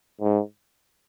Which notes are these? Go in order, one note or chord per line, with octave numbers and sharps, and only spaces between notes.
G#2